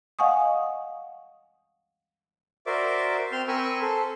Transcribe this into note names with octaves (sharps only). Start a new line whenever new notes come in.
D#5 F5 F#5 G#5 C#6 D#6
F#4 A#4 C5 D5 E5 D6
C4 C5 C6 F6 G6
C4 A#4 G#5 B5 C#6 E6
A4 C5